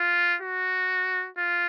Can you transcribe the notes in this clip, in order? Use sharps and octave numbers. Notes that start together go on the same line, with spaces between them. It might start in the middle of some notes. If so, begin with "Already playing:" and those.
Already playing: F4
F#4
F4